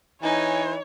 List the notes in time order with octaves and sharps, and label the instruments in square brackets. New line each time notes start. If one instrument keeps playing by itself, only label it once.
[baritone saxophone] E3 [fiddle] D#4 [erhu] C#5 [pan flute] G#5